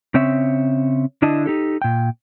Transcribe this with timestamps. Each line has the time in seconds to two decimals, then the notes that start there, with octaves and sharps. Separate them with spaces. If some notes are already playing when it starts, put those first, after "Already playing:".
0.14 C#3 C4 C#5 E5
1.22 D3 D4 E4 D#5 A5
1.46 D#4 G4 A4
1.82 A#2 G5